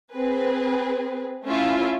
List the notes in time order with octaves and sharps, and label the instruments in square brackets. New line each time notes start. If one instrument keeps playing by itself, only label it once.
[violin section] C4 G#4 B4
A3 C#4 E4 F4 E5